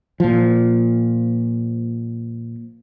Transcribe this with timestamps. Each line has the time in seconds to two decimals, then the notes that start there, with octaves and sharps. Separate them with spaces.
0.20 A#2 F3